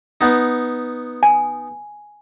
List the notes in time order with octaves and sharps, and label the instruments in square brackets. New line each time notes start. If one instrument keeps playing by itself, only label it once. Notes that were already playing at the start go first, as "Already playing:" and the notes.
[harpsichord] B3 D#4
[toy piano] G#5